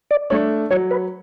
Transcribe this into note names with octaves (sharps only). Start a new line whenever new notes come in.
D5
A3 D4 C#5
F#3 C#5
B4